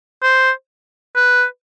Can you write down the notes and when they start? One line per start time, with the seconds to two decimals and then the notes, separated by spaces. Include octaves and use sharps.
0.23 C5
1.16 B4